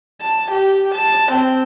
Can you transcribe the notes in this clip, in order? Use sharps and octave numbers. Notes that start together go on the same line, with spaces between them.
A5
G4
A5
C4